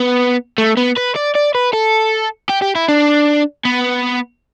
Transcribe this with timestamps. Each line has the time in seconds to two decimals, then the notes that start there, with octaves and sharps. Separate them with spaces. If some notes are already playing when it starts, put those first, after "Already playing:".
Already playing: B3
0.58 A3
0.77 B3
0.97 B4
1.16 D5
1.35 D5
1.55 B4
1.73 A4
2.50 G4
2.62 G4
2.75 E4
2.89 D4
3.65 B3